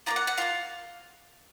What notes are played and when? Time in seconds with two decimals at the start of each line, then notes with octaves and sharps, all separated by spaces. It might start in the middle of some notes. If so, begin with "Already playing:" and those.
0.06 A#3 D4 F4 A#5
0.16 F#5
0.27 F#5
0.38 A#3 D4 F4 F5